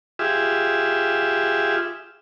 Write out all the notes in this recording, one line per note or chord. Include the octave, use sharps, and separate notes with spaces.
F4 G4 G#4 E5